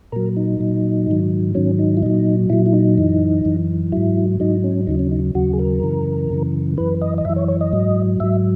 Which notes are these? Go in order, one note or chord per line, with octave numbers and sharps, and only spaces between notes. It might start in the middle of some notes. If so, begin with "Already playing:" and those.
A#2 F#3 A#4
D#4
A#2 F#3
G#2 D#3 F#3
G#2 D#3 F#3 C#4
D#4
E4
A#2 F#3 D#4
A#2 F#3 E4
E4
D#4
F#2 E3
F#2 E3
G#2 F#3 E4
G#2 F#3 D#4
C#4
D#2 C#3 F#3 D#4
C#4
D#4
D#2 C#3 F#3 F#4
G#4
A#4
F#2 C#3 E3
F#2 C#3 E3
F#2 E3 B4
D#5
D#5
F#2 E3 E5
C#5
C#5
D#5
G#2 F#3
G#2 F#3 E5